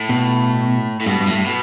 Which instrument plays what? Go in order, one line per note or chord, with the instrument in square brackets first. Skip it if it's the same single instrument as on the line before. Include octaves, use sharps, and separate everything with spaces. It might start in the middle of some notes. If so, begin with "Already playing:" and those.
Already playing: [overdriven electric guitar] A2
[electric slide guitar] B2
[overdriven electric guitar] A2
[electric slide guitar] G2 [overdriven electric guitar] B2
[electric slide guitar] G2
[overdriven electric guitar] A2
[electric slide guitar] G2
[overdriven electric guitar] B2